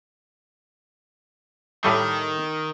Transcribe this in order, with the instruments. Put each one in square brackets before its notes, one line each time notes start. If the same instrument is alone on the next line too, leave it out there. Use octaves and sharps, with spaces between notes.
[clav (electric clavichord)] A2 G3 A3 [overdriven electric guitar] D#3